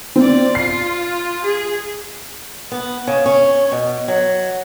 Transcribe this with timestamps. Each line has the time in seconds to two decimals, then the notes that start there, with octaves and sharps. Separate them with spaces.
0.16 C4 F4 D5
0.55 F4 C7
1.44 G#4
2.72 B3
3.07 C#3
3.26 C#4
3.72 B2
4.08 F#3